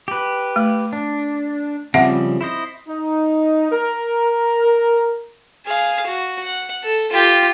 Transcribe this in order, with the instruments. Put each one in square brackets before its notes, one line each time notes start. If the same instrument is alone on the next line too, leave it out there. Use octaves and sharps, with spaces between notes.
[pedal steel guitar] G4 B4
[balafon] A3
[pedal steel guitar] D4
[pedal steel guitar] C#3 F3 G3 [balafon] C4 E5 F#5
[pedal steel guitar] E4 C5 D#5
[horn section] D#4
A#4
[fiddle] G#4 F5
F#4
F#5
A4
F4 G4